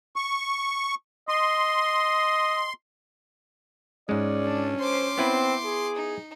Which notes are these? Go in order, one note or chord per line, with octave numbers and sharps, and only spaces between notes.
C#6
D#5 C6
G#2 G#3 C#4 D5
D4
C5 C6 D6
B3 C4 E4 B4
G#4
D#4